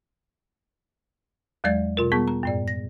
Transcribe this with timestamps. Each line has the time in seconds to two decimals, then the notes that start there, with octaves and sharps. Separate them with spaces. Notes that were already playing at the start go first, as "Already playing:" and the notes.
1.64 E2 F#3 G#3 D5 A6
1.97 B2 F4 A#4
2.12 G3 B3 G#4 A5 C#6
2.28 A#5
2.43 F#2 A2 D5
2.68 A#6